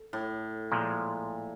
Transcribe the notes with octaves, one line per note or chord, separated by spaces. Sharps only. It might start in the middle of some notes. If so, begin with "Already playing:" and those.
Already playing: A4
A2
A#2 F3 G#3